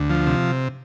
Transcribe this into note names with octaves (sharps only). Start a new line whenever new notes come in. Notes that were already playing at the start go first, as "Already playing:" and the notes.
Already playing: D2
F3
C3